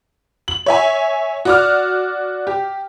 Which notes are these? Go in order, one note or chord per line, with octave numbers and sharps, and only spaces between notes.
F#7
C#5 E5 G#5
F#4 D5 F6
G4